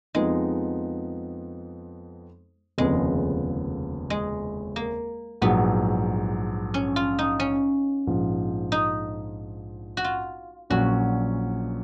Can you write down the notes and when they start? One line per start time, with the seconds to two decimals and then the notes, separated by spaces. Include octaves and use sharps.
0.15 F2 F3 G#3 B3 D#4
2.78 F1 D#2 C#3 F3 G#3 B3
4.10 G#3
4.76 A#3
5.42 A#1 G#2 F#3 B3
6.74 C#4
6.96 F4
7.19 D#4
7.40 C#4
8.07 A#1 G#2 F3
8.72 D#4
9.97 F#4
10.04 F4
10.70 A#1 A#2 F#3 C#4 F#4